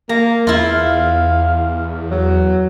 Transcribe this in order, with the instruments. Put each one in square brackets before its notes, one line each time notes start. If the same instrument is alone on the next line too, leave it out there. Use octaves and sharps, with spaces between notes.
[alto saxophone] A#3 [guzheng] A#5
[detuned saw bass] E2 [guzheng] E4 F4 [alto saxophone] F5
[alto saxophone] F#3